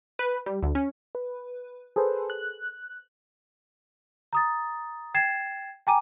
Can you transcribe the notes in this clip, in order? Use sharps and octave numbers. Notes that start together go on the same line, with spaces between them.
B4
G3
D2
C#4
B4
G#4 A4 B4 C5
F#6
A#5 D#6 A6
G5 G#6 A6 C7 E7
G5 G#5 A#5 D6 D#7